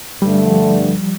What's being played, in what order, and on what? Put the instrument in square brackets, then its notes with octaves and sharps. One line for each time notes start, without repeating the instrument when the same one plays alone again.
[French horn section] G2 D3 A3 [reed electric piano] G3
[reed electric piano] F3